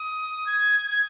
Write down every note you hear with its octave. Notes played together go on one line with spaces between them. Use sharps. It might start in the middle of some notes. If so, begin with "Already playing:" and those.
Already playing: D#6
G#6
G#6